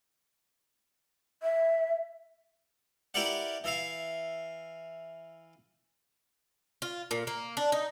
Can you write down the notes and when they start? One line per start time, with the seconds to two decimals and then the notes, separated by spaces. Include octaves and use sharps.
1.43 E5
3.14 E4 G4 A#4 B4 D5 F#5
3.64 E3 E5 F5
6.82 F4
7.11 A#2
7.27 A#3
7.57 D4
7.72 D#4